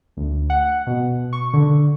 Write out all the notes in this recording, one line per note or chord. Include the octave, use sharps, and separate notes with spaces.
D2
F#5
B2
C#6
D3